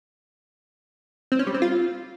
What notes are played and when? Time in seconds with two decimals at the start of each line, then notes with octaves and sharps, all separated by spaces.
1.32 C4
1.39 C#4
1.47 G3
1.54 C4
1.62 F4